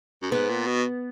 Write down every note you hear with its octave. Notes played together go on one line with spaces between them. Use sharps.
F#2
G#2 B3
A#2
B2